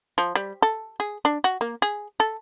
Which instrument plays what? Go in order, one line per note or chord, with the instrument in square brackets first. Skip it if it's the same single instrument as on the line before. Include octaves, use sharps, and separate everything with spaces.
[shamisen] F3
G3
A4
G#4
D4
F#4
A#3
G#4
A4